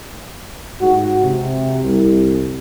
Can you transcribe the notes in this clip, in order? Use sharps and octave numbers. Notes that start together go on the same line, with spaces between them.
G#2 F#4
C3
C2